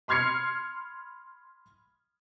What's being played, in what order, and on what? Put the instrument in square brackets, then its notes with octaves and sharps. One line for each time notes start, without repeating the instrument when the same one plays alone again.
[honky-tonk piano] B5 C6 F6 G#6 C7 C#7